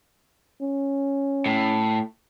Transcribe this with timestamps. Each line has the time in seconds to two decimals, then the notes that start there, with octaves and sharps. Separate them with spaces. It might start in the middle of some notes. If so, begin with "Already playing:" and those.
0.61 C#4
1.46 A2